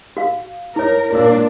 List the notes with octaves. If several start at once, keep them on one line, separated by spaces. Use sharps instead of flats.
F#4 F5
E4 A#4 C#5
A#2 A#3 D4 F#4 A#4